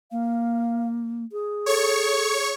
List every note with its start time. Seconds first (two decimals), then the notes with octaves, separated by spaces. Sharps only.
0.12 A#3 F5
1.32 G#4
1.66 A4 C#5 C#6